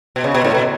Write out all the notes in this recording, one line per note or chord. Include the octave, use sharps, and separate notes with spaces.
B2
C#3
B2
A2
B2